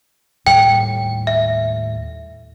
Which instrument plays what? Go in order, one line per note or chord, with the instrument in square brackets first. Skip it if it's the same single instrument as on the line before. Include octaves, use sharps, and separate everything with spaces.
[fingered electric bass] D#2 A2 G3 [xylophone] G5
[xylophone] E5